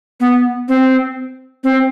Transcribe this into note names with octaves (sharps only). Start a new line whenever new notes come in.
B3
C4
C4